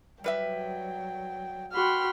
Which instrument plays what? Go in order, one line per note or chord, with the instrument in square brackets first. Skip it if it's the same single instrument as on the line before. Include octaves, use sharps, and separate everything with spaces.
[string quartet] F#3 [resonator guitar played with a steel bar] G3 B4 E5 [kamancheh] G5
[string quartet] F#4 B5 C6 [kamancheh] G5 F6